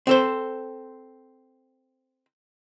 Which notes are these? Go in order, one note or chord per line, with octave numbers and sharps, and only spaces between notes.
C4 A4 C5